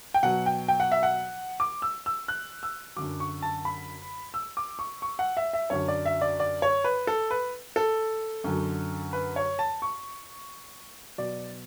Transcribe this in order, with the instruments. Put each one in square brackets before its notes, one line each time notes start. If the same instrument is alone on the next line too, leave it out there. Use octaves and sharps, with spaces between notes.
[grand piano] G5
B2 F#3 F#5
G5
G5
F#5
E5
F#5
D6
E6
E6
F#6
E6
F#2 D3 F#3 D6
C#6
A5
B5
E6
D6
C#6
C#6
F#5
E5
E5
F#2 D3 F#3 C#5
D5
E5
D5
D5
C#5
B4
A4
B4
A4
F#2 D3 F#3
B4
C#5
A5
C#6
B2 F#3 D5